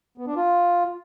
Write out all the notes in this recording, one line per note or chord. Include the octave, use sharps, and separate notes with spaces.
B3
D4
F4